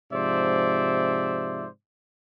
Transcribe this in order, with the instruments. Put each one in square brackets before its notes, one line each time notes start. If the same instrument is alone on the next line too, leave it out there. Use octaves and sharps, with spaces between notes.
[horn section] G#2 C3 F3 C5 D5 E5